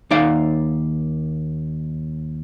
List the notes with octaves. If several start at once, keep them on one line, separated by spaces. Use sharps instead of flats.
D#2 D#4 D5 F5